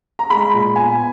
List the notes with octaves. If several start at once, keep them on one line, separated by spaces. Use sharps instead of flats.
A#5
G#3 B5
A#2
B3 G#5